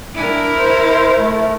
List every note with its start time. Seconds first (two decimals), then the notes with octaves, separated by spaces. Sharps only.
0.15 D4 E4 A#4
0.57 C5
1.18 A3